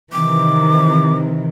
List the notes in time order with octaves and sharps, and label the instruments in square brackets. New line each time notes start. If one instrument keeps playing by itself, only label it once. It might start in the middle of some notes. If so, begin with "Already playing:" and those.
[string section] C3 D#3 E3 [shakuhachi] D6